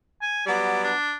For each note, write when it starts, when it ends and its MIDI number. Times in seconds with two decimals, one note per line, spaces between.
0.22 0.42 80
0.47 0.91 54
0.47 0.91 55
0.47 0.91 59
0.47 0.79 74
0.83 1.17 62